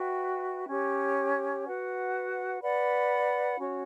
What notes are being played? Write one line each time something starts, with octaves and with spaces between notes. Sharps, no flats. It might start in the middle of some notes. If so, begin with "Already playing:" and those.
Already playing: F#4 B4 E5 G5
C#4 G4 C#5
F#4 B4 F#5
B4 D5 F#5 B5
C#4 F#4 C#5